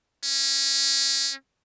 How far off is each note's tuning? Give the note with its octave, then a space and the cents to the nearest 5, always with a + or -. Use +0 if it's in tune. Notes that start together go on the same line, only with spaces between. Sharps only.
C#4 -20